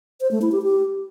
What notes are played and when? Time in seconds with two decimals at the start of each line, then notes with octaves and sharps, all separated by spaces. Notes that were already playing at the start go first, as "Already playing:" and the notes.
0.21 C5
0.31 A3
0.42 E4
0.52 G4
0.62 G4